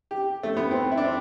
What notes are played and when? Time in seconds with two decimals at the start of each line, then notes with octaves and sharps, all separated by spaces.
0.11 G4
0.43 A3
0.57 B3
0.71 C4
0.92 E4
0.97 D4
1.04 C4